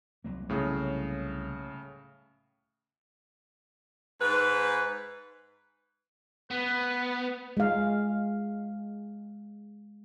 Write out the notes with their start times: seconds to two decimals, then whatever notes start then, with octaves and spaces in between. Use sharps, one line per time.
0.24 C2 F#3 A#3
0.49 A2 C#3
4.21 G#2 B4
6.51 B3 B4
7.57 G#3 F5